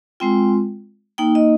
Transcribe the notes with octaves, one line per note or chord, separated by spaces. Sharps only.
G#3 C4 F4 G5
A#3 D#4 G5
D#5